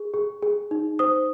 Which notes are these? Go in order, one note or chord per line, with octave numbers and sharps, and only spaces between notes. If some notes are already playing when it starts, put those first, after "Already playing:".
Already playing: G#4
G#4
G#4
D#4
C5 D#6